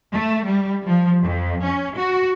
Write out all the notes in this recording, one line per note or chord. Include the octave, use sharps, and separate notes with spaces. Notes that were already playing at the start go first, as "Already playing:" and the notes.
A3
G3
F3
F2
C#4
F#4